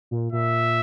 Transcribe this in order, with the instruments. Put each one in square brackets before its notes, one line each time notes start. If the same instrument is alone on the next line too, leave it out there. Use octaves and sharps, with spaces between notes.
[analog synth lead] A#2
[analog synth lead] A#2 [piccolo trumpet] E5